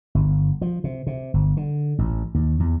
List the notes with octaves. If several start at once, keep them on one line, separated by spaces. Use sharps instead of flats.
G1
F3
C3
C3
G1
D3
A1
D#2
E2